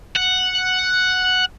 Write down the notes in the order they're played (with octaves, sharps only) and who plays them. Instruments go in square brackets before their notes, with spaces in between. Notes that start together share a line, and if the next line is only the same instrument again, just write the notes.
[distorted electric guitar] F#5